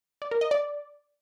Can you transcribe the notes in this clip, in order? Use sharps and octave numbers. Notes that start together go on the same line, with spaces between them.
D5
A#4
D#5
D5